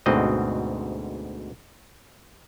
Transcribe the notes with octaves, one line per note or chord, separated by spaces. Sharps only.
D2 G#2 B2 C4 D#5